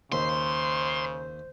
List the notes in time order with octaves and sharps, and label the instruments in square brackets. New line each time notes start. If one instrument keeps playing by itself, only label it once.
[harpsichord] D#2 [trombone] C#3 [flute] C5 [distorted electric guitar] C6